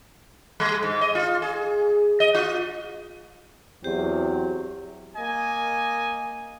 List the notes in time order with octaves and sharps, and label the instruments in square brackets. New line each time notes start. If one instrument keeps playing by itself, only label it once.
[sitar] G3
G#2
D#5
F4
G#4
D#5
F4
[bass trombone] E2 [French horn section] F#3 C4 [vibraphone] G4 C5
[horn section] A#3 D#5 G#5